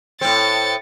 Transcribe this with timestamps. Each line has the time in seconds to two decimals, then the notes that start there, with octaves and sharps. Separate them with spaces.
0.21 A2 C4 A6 C#7